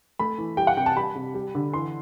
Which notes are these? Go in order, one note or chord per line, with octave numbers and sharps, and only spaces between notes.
A3 B5
E3
G3 G5
F#5
C3 G5
A5
G3 B5
C3
G3
D3
E3 C6